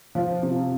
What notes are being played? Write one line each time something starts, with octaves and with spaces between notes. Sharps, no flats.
F3
C3